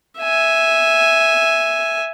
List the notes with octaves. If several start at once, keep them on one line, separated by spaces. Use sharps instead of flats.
E5 G#5